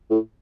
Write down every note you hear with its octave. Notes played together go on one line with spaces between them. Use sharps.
A2